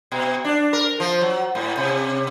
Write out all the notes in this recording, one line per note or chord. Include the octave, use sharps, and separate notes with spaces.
B2
D4
A#4
F3
F#3
A2
C3